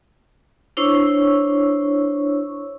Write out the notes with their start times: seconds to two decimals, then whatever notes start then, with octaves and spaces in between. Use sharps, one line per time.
0.77 D4 E4 C5 C#5 C#6 E6